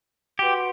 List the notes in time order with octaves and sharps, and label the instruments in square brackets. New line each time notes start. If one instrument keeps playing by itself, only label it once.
[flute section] F#4 B4 F#5 C6 [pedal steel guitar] G4